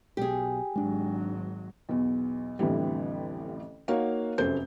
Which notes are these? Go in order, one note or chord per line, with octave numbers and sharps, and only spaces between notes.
B1 B2 G4 G#4
G#1 F#3 G#3 D4
B1 E2
A1 F2 D3 E3 G3
A#3 D#4 F#4 C#5 F5
F1 F#2 A3 C5 G6